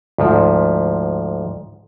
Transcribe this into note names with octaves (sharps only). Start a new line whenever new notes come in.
D2 G#2 F3